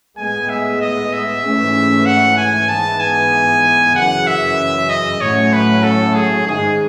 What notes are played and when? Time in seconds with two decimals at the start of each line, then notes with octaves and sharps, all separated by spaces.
0.17 A2 G#3 B3 G#5
0.49 E5
0.81 D#5
1.13 E5
1.43 G#2 E3 A3 C#4
2.06 F#5
2.37 G#5
2.69 G#2 E3 B3 A5
3.00 G#5
3.95 F#2 C#3 E3 F#5
4.27 E5
4.89 D#5
5.21 A2 F#3 A3 C#4 C#5
5.53 B4
5.83 A4
6.15 G#4
6.47 G#2 D#3 G#3 G#4